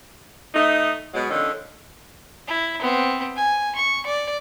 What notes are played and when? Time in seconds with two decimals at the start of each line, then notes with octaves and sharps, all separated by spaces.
0.54 A3 D#4
1.13 B2 F#3 G#3
1.30 D3 D#3 F3 C#4 A4
2.48 E4
2.80 B3 C4
3.36 G#5
3.75 C#6
4.06 D5